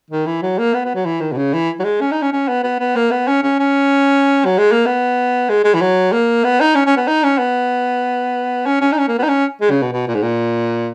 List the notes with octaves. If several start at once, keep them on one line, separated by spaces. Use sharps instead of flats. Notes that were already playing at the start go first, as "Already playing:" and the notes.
D#3
E3
F#3
A#3
B3
B3
F#3
E3
D#3
B2
C#3
E3
F#3
G#3
C#4
D#4
C#4
C#4
B3
B3
B3
A#3
B3
C#4
C#4
C#4
F#3
G#3
A#3
B3
G#3
G#3
E3
F#3
A#3
B3
D#4
C#4
C#4
B3
D#4
C#4
B3
C#4
C#4
D#4
C#4
A#3
B3
D#4
C#4
G#3
C#3
B2
B2
A#2
G#2
A#2